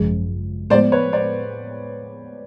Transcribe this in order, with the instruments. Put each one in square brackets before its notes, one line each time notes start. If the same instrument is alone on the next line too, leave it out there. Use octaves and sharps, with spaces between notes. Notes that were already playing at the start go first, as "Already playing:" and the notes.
Already playing: [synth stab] G#1 F#2 C#3 F3 G#3
[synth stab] A2 F3 G#3 B3 [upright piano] C5 D5
[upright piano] B4 C#5
C5 D5